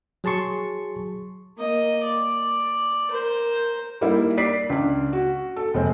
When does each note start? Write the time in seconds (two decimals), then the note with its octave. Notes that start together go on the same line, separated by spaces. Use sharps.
0.24 F#3 G#4 A5 C6 C#6
1.57 A#3 D#5
2.04 D5
3.10 A#4 C5
4.01 G3 A#3 D#4 E4
4.37 D5 B6 C7
4.70 C#2 D4
5.13 F#4
5.56 A4
5.74 F1 G#3 C4